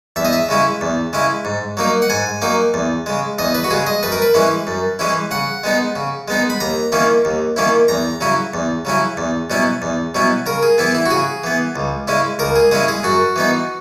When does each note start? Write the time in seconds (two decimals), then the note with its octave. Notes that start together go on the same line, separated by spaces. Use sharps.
0.16 E2 E5
0.25 D#5
0.33 E5
0.49 C#3 G#3 C#4 E4
0.81 E2
1.13 C#3 G#3 C#4 E4
1.45 G#2
1.77 F#3 A#3 D#4
2.02 F#5
2.10 G#2 G#5
2.42 F#3 A#3 D#4
2.74 E2
3.06 C#3 G#3
3.38 E2 D#5
3.55 B4
3.64 F#4
3.70 C#3 G#3 G#4
3.87 D#5
4.03 F#2 B4
4.12 A#4
4.22 B4
4.34 E3 G#3 C#4 E4
4.67 F#2
4.99 E3 G#3 C#4 E4
5.31 C#3 F#5
5.64 G#3 B3 D#4
5.96 C#3
6.28 G#3 B3 D#4
6.50 B5
6.60 D#2 A#5
6.92 D#3 A#3 C#4 E4
7.25 D#2
7.56 D#3 A#3 C#4 E4
7.88 E2 A#5
8.21 C#3 F#3 C#4 E4
8.54 E2
8.85 C#3 F#3 C#4 E4
9.17 E2
9.50 B2 F#3 C#4 E4
9.82 E2
10.15 B2 F#3 C#4 E4
10.46 C#3 A#4
10.63 G#4
10.78 E3 B3 E4
10.95 E4
11.06 F#4
11.11 C#3 G#4
11.44 E3 B3
11.76 C#2
12.08 C#3 G#3 C#4 E4
12.39 C#2 A#4
12.56 G#4
12.71 C#3 G#3 C#4 E4 G#4
12.88 G#4
13.03 F#2 F#4
13.36 E3 B3 D#4